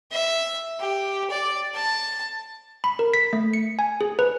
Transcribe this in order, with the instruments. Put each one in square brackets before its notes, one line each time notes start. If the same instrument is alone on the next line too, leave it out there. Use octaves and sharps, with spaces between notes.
[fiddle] E5
G4
D5
A5
[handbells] B5
A#4
B6
A3
C#7
G#5
G#4
B4